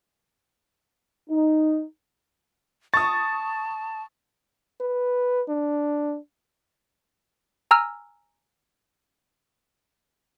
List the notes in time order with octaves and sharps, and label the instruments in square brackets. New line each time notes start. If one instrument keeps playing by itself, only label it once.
[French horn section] D#4
[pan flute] A5 [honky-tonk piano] C#6 D#6 [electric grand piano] A6
[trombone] B4
D4
[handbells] G#5 A#5 E6 F6